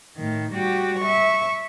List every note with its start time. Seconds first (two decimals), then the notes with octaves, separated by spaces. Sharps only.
0.16 A2 D#3
0.52 G3 F#4 G4
1.00 E5 C#6